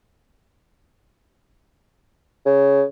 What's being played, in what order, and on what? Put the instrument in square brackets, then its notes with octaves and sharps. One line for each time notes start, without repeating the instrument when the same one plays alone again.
[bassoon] C#3